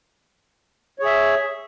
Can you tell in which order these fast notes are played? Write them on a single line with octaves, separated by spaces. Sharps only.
C#5 G#4 E5